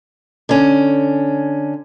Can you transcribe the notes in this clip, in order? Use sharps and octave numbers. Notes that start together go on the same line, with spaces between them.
D3 C#4